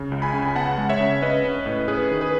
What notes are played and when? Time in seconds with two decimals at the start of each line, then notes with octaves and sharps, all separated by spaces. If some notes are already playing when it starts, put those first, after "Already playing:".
Already playing: C#3
0.12 C#2
0.22 G#5 B5
0.34 C#3
0.48 G#5
0.56 B3 F#5 A5
0.78 G#3
0.89 C#5 E5
1.00 C#3
1.22 C#4 B4 D#5
1.45 C#4
1.66 A2
1.88 C#4 G#4 B4
2.11 D#3
2.21 G#4 B4